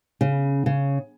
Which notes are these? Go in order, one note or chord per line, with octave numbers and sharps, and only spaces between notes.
C#3
C#3